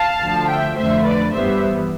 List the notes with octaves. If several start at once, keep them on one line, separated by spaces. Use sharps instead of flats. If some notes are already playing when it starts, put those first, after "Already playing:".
Already playing: F5 A5
D2 D3 F3
E5 G5
F2 D3 A3 C5 E5
B4 D5
G2 E3 G3 B3 C5 E5